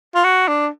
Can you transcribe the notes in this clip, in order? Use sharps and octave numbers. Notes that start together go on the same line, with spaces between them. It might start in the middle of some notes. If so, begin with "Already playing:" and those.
F4
F#4
D4